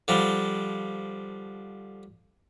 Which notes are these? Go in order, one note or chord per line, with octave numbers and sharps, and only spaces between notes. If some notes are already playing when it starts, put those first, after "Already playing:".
D3 F3 G3